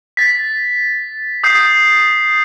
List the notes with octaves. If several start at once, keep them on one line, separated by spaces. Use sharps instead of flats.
A6 B6
D#6 G6 C7